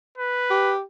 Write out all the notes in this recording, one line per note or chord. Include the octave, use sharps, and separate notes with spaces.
B4
G4